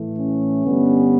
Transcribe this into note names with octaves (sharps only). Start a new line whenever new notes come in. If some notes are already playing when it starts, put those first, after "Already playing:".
Already playing: A2 E3 A3
C#4
G2 D3 G3 B3